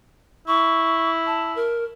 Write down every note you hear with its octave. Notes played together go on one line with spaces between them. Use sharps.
E4 C#6
A5
A#4